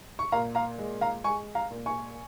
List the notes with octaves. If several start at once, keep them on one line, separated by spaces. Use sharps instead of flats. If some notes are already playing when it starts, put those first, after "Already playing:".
C#6
A#2 F5 A#5
F5 A#5
G#3
F5 A#5
G#3 G#5 C#6
F5 A#5
A#2
G#5 C#6